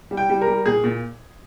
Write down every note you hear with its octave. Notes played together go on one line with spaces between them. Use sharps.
G3
G5
G3
A#4
G3
A#2 G#4
A#2